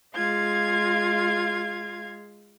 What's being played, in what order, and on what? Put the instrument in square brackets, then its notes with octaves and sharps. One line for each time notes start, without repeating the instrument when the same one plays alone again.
[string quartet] G#3 F4 F5 G#6